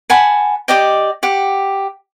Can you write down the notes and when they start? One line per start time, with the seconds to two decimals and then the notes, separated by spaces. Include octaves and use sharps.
0.10 F#5 G#5 A5 B5
0.68 G4 D5 D#5 G5
1.23 G4 F#5